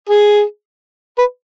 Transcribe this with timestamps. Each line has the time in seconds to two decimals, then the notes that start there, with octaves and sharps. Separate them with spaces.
0.09 G#4
1.18 B4